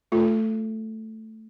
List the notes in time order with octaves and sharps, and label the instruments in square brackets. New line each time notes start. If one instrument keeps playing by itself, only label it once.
[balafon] A3 F4 A4